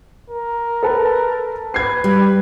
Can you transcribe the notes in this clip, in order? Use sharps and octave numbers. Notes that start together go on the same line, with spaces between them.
A#4
A4 B4 A5
B4 G#6 C7
G3